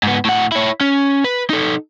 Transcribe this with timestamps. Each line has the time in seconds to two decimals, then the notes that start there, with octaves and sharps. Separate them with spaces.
0.03 G#2 B3
0.25 A2 F#5
0.52 E4 C#5
0.81 C#4
1.24 B4
1.50 D#4 A4